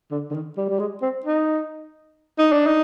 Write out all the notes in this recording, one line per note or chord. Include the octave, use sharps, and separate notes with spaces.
D3
D3
D#3
G3
G3
G#3
C4
D#4
D#4
D4
D#4